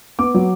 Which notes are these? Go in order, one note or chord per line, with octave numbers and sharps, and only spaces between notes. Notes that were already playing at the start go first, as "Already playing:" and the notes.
B3 D6
F#3